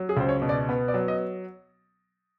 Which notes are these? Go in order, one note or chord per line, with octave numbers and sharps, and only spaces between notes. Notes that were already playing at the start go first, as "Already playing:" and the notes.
Already playing: F#3
G#4
C#2 C5
C#5
B2
D5
B3
D5
F#3
D#5